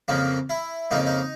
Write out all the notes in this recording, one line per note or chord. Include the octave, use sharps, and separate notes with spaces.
F2 C#3 F3 A#3
E4
F2 C#3 F3 A#3 D#4
D#4